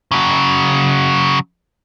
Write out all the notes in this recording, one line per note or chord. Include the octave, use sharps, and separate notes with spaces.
C#3 F#3